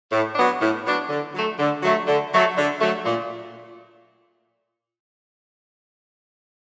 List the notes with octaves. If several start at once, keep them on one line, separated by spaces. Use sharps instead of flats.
A2
F#3 B3 D4
A2
F#3 B3 D4
D3
F#3 A3
D3
F#3 A3
D3
F#3 A3
D3
F#3 A3
A#2